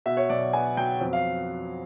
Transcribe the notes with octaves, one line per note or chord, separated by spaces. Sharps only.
B2 E5
C#5
B1 D5
B3 G#5
F#3 G5
F2
F5